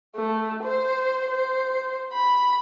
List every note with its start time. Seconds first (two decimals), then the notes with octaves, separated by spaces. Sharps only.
0.16 A3
0.64 C5
1.31 C5
2.13 B5